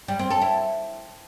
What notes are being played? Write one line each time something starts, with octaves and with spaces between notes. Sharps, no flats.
G3
C4
A4
E4